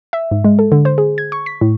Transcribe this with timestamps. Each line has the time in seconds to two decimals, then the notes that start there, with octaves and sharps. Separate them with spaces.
0.13 E5
0.31 G#2
0.44 G#3
0.59 A4
0.72 D3
0.85 C5
0.98 G#4
1.18 G#6
1.32 C#6
1.46 B6
1.61 A2